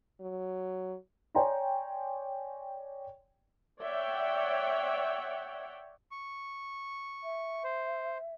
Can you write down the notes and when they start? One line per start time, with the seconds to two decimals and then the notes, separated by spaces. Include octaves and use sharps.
0.21 F#3
1.35 C#5 D5 G5 G#5 A#5 C6
3.82 C#5 D5 E5 F#5 G5
6.11 C#6
7.23 E5
7.64 C5